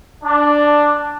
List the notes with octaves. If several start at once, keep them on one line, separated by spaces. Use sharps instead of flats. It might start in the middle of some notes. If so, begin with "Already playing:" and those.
D4